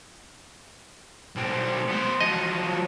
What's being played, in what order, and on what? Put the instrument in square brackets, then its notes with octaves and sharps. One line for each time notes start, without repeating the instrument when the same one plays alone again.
[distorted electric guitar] B1 C4
B3 C5
[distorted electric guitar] F3 F#3 [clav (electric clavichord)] D#5